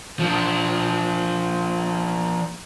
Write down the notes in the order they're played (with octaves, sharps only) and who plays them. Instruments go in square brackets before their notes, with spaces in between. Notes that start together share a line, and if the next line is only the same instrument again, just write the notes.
[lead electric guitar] F3 D4